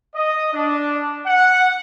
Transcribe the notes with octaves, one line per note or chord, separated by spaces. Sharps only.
D#5
D4
F#5